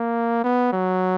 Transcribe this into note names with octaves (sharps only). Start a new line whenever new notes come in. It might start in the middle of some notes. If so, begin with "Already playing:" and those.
Already playing: A#3
B3
F#3